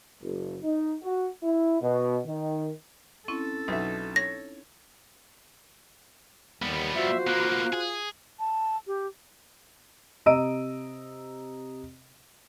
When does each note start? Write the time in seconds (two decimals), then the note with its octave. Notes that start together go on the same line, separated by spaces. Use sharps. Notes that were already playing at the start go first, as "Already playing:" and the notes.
0.22 F#1
0.63 D#4
1.02 F#4
1.43 E4
1.80 B2
2.25 D#3
3.28 C4 C#4 E4 A4 C#6
3.68 B1 B2 D#4 E5
4.16 C#5 A#6
6.62 D#2 G3 B3
6.95 F4 F#4 C5 E5
7.27 A#3 B3 F#6
7.73 G#4
8.39 A5
8.87 G4
10.26 C3 D#5 A#5 E6 D7 D#7